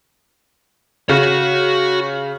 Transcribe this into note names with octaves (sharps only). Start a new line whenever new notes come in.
C#3 F#4 F#5